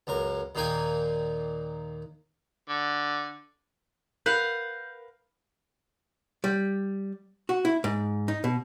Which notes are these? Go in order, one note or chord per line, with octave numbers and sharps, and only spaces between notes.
C#2 F#2 A#4
D#2 A#2 A#3 D#4 G5 G#5
D3
A#4 B4 F5 F#5 G6
G3
F#4
E4
G#2
D#4
B2